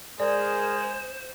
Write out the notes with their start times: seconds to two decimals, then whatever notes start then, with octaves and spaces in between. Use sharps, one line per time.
0.20 G#3 G#4 A#4 C5 D5